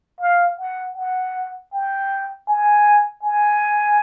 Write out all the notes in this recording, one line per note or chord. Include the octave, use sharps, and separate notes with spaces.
F5
F#5
F#5
G5
G#5
G#5